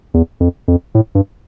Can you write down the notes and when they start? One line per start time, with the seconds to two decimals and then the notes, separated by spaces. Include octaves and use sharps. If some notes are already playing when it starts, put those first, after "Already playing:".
0.14 E2
0.40 F2
0.68 F2
0.95 A2
1.15 G2